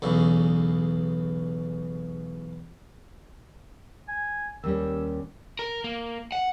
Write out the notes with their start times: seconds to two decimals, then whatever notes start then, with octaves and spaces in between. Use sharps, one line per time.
0.02 B1 E2 C#3
4.08 G#5
4.64 D#2 G3 C#4 E6
5.59 A#4
5.84 A#3
6.32 F#5